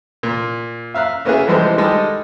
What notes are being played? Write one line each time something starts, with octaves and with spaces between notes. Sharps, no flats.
A#2
E5 F5 A#5 F#6
A#3 B3 C#4 E4 F#4 G#4
E3 F3 G3 G#3 A4 C5
D#3 G3 G#3 A4 D#5